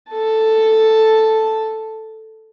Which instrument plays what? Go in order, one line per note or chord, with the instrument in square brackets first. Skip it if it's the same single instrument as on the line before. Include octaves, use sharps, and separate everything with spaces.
[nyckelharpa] A4 A5